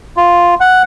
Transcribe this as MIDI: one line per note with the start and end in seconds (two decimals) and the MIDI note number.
0.17 0.55 65
0.60 0.82 78